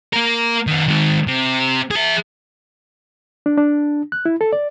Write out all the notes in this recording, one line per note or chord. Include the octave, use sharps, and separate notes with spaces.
A#3 A#4
D#3 B3
D#3 G#3
C3
G#4 E5
D4
D4
F#6
E4
A4
D5